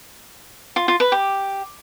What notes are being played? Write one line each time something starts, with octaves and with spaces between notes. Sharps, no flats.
F4
F4
B4
G4